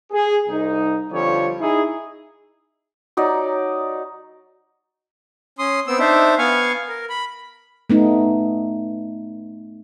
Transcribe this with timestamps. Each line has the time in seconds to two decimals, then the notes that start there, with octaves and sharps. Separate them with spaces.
0.12 G#4
0.48 C2 D#4
1.11 F2 D3 F3 G3 C#5
1.60 D#4 E4 G#4
3.17 F#3 D#4 D5
5.59 C#4 C6 D#6
5.87 B3 C4 E6
5.99 D4 D#4 C5 E5
6.38 B3 F5 G#5 C#6
6.88 A#4
7.09 B5
7.90 A3 B3 D#4